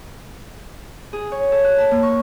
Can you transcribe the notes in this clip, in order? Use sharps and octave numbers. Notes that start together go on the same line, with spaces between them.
G#4
C#5
A4
F#6
A5
A#3
C#6